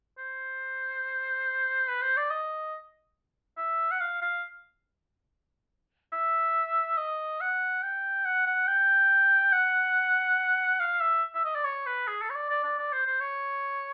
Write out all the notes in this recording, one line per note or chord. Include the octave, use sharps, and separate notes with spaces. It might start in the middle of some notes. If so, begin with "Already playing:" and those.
C5
B4
C5
D5
D#5
E5
F#5
F5
F5
E5
D#5
F#5
G5
F#5
F#5
G5
F#5
F5
E5
E5
D#5
D5
C#5
B4
G#4
A4
C#5
D5
D5
D5
D5
C5
C5
C#5